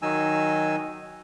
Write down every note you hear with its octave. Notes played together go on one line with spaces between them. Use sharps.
D#3 F#3 D#4 G#5 E6